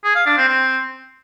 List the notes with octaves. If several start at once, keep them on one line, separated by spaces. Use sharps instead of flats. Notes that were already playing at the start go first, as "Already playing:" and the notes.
G#4
F5
D4
C4
C4